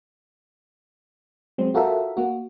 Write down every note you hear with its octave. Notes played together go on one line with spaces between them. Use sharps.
F#3 G#3 C4
F4 F#4 A4 A#4 E5
A#3 F#4